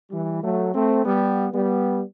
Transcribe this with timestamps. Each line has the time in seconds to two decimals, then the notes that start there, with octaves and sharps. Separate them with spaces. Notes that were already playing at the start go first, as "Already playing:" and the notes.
0.11 E3 G3
0.43 F#3 A3
0.75 A3 C4
1.05 G3 B3
1.52 G3 B3